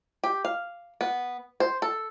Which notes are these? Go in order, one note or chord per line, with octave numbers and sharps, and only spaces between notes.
G4
F5
B3
C5
A4